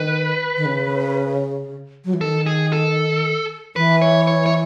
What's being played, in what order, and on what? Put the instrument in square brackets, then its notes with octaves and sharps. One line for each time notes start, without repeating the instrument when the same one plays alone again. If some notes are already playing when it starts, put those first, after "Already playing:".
Already playing: [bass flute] D#3 [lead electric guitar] B4
[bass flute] D#3
C#3
F#3
E3
[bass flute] D#3 [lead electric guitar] A4
[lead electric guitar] G#4
A4
[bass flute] E3 [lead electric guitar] B4
[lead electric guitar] C#5
C#5
C#5